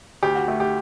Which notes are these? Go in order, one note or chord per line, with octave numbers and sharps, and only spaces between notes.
D2 G4
F#4
A3 G4
G4